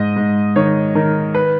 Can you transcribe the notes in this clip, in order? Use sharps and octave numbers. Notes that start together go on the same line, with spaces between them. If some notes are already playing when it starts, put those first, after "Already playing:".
Already playing: G#2 D#5
G#2
D#3 C#5
D#3 A#4
B4